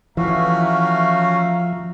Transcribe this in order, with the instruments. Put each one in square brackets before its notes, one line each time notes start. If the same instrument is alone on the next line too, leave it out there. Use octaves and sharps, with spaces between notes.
[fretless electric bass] E3 [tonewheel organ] F3 [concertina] A3 C#4 F#4 [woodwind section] E5 F5 A#5